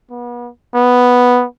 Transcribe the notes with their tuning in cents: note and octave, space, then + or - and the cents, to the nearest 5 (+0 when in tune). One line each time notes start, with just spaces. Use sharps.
B3 -35
B3 +0